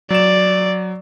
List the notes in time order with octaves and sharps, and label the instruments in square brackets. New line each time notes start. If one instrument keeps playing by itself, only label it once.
[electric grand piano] F#3 E7 [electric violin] D5